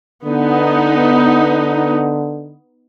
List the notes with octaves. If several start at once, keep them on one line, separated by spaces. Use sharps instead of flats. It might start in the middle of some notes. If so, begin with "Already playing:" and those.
D3 B3 D#4